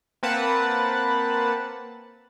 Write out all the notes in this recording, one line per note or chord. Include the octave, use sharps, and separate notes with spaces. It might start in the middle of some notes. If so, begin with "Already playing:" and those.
A#3 C4 B4 F#5 A5